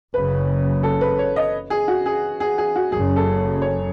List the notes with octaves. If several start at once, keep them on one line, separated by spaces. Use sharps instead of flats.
F#1 F#2 C#3 B4
A4
B4
C#5
D#5
G#4
F#4
G#4
G#4
G#4
F#4
F#1 F#2 C#3 G#4
A4
C#5